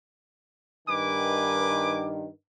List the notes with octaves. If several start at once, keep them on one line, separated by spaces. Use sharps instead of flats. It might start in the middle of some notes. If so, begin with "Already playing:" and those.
G2 D#3 B4 G#5 D6